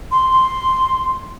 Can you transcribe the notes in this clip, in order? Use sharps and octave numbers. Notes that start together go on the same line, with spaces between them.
C6